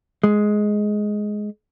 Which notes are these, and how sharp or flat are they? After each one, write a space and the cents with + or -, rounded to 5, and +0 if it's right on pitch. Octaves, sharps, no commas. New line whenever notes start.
G#3 +10